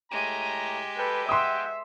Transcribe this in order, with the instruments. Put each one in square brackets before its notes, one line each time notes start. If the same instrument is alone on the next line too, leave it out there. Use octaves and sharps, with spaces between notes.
[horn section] A2 A3 A#5 [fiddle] G#3 G4
[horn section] A4 G5 [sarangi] B4
[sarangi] E5 [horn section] F#5 G5 [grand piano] C6 D#6